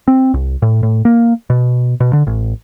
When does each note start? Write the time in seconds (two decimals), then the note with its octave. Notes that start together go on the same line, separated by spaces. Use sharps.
0.08 C4
0.34 C2
0.62 A2
0.83 A2
1.05 A#3
1.50 B2
2.00 B2
2.13 D3
2.27 A1